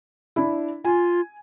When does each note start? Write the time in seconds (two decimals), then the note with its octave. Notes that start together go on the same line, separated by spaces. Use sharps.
0.36 D4 E4
0.85 F4 G#5